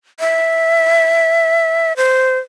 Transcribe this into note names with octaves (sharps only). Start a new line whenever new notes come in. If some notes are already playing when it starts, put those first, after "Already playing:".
E5
C5